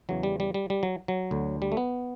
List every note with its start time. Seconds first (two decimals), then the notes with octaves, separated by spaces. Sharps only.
0.09 E2 C#3 E3 F#3
0.23 G3
0.40 G3
0.54 G3
0.70 G3
0.83 F#3
1.08 F#3
1.31 D2 D3
1.62 G3
1.72 A3
1.77 B3